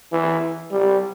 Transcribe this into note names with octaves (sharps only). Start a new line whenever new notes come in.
E3
G3